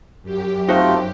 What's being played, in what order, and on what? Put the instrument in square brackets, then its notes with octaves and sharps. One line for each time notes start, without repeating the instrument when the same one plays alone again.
[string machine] F#2 G4
[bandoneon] A3 C4 F4 [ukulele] D#4 F#4 C5